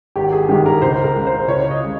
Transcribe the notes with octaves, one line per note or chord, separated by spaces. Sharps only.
G#1 G4
G#4
G2 D#3 G#3 G4
A#4
C#2 C5
A#4
C#3 G#3
C5
C#2 C#5
D#5
C#3 G#3